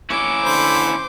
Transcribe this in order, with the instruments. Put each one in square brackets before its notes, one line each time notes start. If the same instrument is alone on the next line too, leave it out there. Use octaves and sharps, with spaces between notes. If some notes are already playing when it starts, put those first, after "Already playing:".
[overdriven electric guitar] C#4 E4 [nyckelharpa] D6
[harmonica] D3 B5 [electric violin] C5